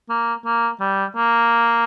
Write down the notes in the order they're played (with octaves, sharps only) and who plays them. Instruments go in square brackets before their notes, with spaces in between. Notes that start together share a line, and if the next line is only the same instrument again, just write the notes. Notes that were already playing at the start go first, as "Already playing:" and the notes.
[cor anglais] A#3
A#3
G3
A#3